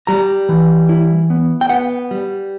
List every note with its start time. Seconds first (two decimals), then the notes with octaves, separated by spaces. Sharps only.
0.07 G3 A#5
0.49 E3
0.89 E4
1.30 B3
1.61 G5
1.69 B3 F#5
2.11 G3